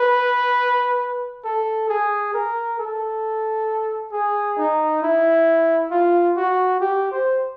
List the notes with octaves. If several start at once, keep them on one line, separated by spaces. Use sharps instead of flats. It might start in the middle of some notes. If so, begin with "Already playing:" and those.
Already playing: B4
A4
G#4
A#4
A4
G#4
D#4
E4
F4
F#4
G4
C5